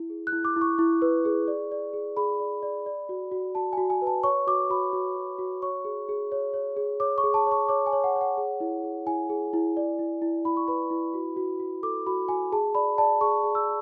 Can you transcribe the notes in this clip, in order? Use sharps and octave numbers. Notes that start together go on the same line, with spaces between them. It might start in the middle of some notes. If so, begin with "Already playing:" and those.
Already playing: E4
G#4
F#6
E4
D6
E4
C#6
E4
B4
G#4
D5
D5
G#4
G#4 B5
D5
D5
D5
F#4
F#4
F#4 A5
F#4 G#5
G#5
B4
A5
C#5 C#6
F#4 D6
F#4 B5
F#4
F#4
F#4
C#5 C#6
G#4
G#4
C#5
C#5
G#4
C#5 D6
C#6
G#4
A5
C#5 C#6
C#5 D6
G#5
C#5
F#5
C#5
F#5
G#4
E4
G#4
E4 G#5
G#4
E4
D5
E4
E4
E4 B5
C#6
B4 B5
E4
F#4
F#4
F#4
A4 D6
F#4 B5
F#4 G#5
G#4 A5
D5 B5
D5 A5
G#4 C#6
G#4
E6